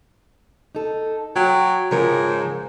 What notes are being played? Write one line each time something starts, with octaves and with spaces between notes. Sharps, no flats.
D#4 A4
F#3 G5
G#2 C#3 F3 A#4